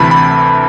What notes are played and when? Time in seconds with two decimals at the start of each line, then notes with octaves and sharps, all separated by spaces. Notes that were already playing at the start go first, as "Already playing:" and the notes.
Already playing: D2 C3 E3 A5 B5
0.11 B5